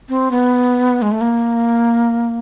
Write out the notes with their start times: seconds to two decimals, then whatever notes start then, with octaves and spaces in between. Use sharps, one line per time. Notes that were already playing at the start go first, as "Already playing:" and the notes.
0.09 C4
0.31 B3
1.02 G#3
1.12 A3
1.21 A#3